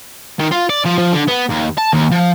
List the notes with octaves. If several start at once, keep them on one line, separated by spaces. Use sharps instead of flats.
D#3
F4
D5
F3
F3
D3
B3
D#2
A5
D#2
F3